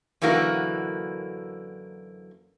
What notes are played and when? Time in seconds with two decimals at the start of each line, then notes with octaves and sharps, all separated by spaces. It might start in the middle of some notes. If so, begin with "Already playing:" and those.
0.22 F#2 D3 E3 A#3 F#4 A#4